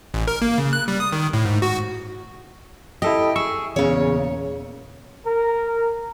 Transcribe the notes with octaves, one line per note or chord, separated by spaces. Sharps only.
A1
A#4
A#3
C#3
F#6
G3
D#6
D#3
A2
G#2
F#4
E4 G4 A4 D#5
G#4 C#6 E6
E2 A#2 C#3 C#5
A#4